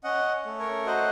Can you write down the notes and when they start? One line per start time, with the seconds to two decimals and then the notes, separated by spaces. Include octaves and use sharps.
0.04 C#4 D#5 F#5
0.45 A3
0.59 A#4 C#5
0.86 F#4 C5 D#5